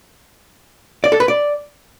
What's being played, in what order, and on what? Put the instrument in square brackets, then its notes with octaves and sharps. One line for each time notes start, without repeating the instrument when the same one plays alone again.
[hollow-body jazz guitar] D5
A4
B4
D5